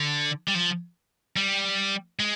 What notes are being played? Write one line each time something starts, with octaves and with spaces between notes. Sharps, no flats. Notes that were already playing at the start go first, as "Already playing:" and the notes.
Already playing: D3
G3
F3
G3
G#3